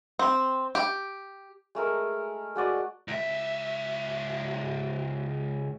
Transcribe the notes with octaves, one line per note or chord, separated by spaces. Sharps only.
C4
G4
G#3 A3 A#4
G#3 F#4 D5 D#5
C#2 E5